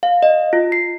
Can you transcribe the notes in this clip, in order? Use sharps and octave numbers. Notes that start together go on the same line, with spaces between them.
F5
D#5
F4
C7